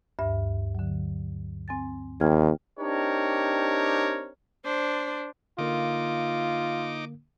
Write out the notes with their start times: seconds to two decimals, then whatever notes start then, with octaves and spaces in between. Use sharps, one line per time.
0.19 D2 G2 E5
0.75 D3 F#3
1.68 C4 G#5 A6
2.21 D#2 G5 F6 G#6
2.80 C4 D4 D#4 G4 A#4 C#5
4.64 D4 C5
5.58 D3 A#3 D#4 F4 D6